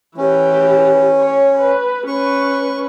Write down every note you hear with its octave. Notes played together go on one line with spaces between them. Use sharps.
E3 C#4 G4
C#5
B4
C#4 B4 C#6